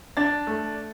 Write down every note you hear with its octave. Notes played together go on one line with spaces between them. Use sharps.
D4 A6
A3